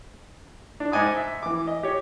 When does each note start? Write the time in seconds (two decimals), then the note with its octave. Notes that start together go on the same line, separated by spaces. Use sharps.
0.80 D4
0.92 G#2 D#5 G#5 D6 D#6
1.17 E5
1.43 E3 D6
1.67 D#5
1.83 G4 C#5